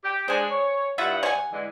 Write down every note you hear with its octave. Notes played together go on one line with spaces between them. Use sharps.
G4
G#3 D4 C5 G#5
C#5
G2 E4 F4 E5 F#5
C#5 G#5
D3 E3 G#3